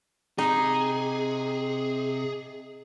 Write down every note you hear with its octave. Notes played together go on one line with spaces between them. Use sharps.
C3 D#4 G#4